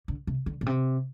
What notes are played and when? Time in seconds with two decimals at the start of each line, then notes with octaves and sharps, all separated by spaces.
0.08 D3
0.27 C3
0.46 D3
0.61 A#2
0.66 C3